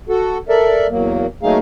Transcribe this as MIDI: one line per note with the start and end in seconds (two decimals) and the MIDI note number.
0.09 0.38 66
0.09 0.38 69
0.49 0.87 69
0.49 0.87 70
0.49 0.87 74
0.49 0.87 76
0.90 1.26 40
0.90 1.26 54
0.90 1.26 58
1.43 1.58 54
1.43 1.58 57
1.43 1.58 58
1.43 1.58 63
1.43 1.58 68
1.43 1.58 77